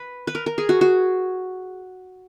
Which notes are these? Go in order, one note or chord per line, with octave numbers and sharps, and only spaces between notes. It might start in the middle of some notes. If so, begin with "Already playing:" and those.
Already playing: B4
B4
A#4
A#4
G#4
F#4
F#4